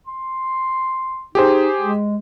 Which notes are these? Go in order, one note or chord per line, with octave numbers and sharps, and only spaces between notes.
C6
D#4 G4 G#4 C5
G#3